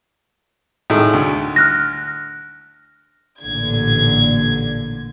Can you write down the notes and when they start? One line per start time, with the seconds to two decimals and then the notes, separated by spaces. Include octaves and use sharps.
0.90 A2 D#3 G#3
1.13 D2
1.56 F6 F#6 A#6
3.42 A1 A#2 D3 G#6